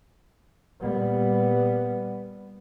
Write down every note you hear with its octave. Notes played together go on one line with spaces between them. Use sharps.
A#2 G3 B3